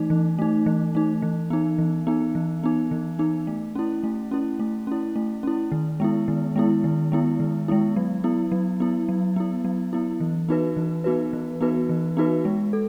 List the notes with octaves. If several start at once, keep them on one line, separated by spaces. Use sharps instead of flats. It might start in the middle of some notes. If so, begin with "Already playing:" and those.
Already playing: E3 A3 D#4
E3
A3 D#4
E3
A3 D#4
E3
B3 D#4
E3
B3 D#4
E3
B3 D#4
E3
B3 D#4
A3
C#4 E4
A3
C#4 E4
A3
C#4 E4
A3
C#4 E4
D#3
G#3 B3 E4
D#3
G#3 B3 E4
D#3
G#3 B3 E4
D#3
G#3 B3 E4
F#3
B3 E4
F#3
B3 E4
F#3
B3 E4
F#3
B3 E4
E3
B3 D#4 F#4 B4
E3
B3 D#4 F#4 B4
E3
B3 D#4 F#4 B4
E3
B3 D#4 F#4 B4
G#3
A4